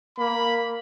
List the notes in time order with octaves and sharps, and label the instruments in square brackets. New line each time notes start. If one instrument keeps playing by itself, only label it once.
[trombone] A#3 [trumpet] B5